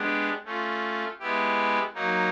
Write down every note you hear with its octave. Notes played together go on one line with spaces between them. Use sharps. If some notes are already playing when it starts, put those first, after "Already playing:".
Already playing: G#3 B3 D4 G4
A3 C#4 F4
G#3 B3 E4 G4
F#3 A#3 D#4